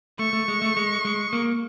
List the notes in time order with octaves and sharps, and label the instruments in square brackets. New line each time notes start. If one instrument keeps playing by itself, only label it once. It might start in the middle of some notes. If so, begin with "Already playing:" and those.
[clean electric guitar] A3 [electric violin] C#6
[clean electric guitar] A3
G#3
A3
G#3
G#3
A#3